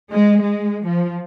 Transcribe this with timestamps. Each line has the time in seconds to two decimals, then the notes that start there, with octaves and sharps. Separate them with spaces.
0.12 G#3
0.42 G#3
0.87 F3